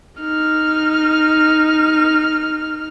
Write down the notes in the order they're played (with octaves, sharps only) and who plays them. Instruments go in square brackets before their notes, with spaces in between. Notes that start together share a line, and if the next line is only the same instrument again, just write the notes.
[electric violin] D#4 F6